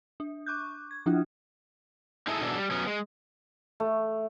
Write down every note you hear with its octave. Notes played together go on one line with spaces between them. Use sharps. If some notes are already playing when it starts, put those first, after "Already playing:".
D4
C#6 D6 F#6 G6
G#6
F3 D4 E4 F4
D#4 E4 G#4 A4 D#5 E5
B2 E3 F#3 D4 G#4 A4
G3
F#3 B3 C#4
G#3
A3